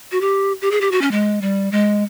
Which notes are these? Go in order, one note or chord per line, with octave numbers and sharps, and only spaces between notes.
F#4
G4
G4
G#4
G4
F#4
C#4
G#3
G3
G#3